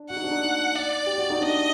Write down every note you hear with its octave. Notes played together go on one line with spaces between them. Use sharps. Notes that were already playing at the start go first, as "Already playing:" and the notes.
Already playing: D4
F#4 F#5
D#4
D4
D#4
D5
G4
F#4
D#4
D4 D#5